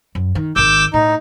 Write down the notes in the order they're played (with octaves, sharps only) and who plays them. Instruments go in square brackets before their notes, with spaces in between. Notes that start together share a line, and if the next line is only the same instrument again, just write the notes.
[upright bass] F#2
D#3
[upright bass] G#1 D#3 [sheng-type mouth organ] D6 E6 G6
[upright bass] A2 [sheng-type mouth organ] D#4